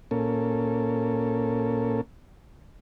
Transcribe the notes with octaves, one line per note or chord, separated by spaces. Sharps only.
A#2 A#3 C#4 A4